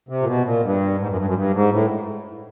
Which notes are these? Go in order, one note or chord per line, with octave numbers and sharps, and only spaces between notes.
C3
A#2
B2
A#2
G2
G#2
F#2
G2
F#2
G2
G#2
A2